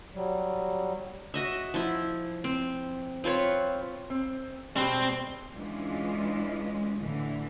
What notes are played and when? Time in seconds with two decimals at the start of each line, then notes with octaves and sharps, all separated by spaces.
0.15 F#3 G3
1.34 F#4 D#5 E5
1.74 F3 E4
2.44 C4
3.24 C4 F4 B4 C#5
4.10 C4
4.77 B2 G3 G#3 C4
5.53 E3 G#3 C#4 D4 F4
6.99 A2 D3 E3